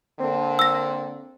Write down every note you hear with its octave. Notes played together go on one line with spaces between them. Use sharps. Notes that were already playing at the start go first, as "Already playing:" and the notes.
D3 A#3 C4
E6 A#6